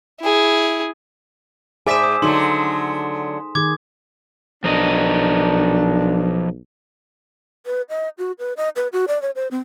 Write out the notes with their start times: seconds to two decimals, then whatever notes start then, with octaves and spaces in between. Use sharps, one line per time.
0.21 E4 G#4
1.87 G#2 G#4 C5 D5 E5 G#5 B6 E7
2.04 D#6
2.22 D3 F#3 A3 D#4 A4 C6
3.55 D#3 G#4 D6 G#6
4.64 B1 F3 D4 A#4 D#5
7.66 B4
7.90 D#5
8.18 F#4
8.39 B4
8.57 D#5
8.76 B4
8.93 F#4
9.08 D5
9.22 C#5
9.36 C5
9.51 C4